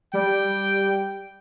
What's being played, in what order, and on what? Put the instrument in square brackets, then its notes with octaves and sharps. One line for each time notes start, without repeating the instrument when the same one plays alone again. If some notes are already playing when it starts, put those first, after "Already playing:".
[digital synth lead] G3 [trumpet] G5